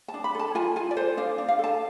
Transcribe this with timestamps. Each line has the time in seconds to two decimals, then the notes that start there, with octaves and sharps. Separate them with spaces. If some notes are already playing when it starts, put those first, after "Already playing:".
0.08 A5
0.14 D4
0.24 B5
0.35 A4 A5
0.55 F4 G#5
0.76 F4 G#5
0.91 D5
0.97 A4 C5
1.17 D4 F5
1.38 D4
1.48 F5
1.59 A4 A5